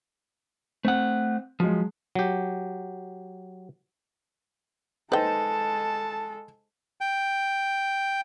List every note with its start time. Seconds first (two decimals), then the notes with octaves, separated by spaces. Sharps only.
0.85 A3 C4 F#5
1.60 F3 F#3 G#3
2.15 F#3 G4
5.12 G#3 D#4 A4 B4 C5 G5 A5
7.01 G5